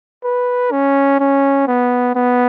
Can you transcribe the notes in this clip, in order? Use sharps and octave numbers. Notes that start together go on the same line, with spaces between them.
B4
C#4
C#4
B3
B3